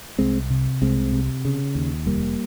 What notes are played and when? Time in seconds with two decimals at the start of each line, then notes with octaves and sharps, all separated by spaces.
0.19 C2 G#3 C4
0.50 C3
0.82 C2 G#3 C4
1.12 C3
1.45 C#3
1.75 D#2
2.06 F1 G3 A#3